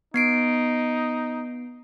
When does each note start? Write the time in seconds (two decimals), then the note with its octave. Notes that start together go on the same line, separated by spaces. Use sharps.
0.14 B3 D#4 C7 D7